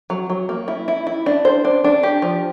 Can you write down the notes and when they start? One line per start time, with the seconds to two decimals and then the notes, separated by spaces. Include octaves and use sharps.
0.10 F#3
0.30 F#3
0.49 A#3
0.68 E4
0.88 E4
1.07 E4
1.26 D4
1.45 C5
1.65 D4
1.84 D4
2.03 G4
2.22 F3